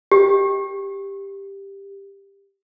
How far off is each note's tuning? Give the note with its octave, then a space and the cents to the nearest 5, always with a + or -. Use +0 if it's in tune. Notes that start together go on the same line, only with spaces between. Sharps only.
G4 +10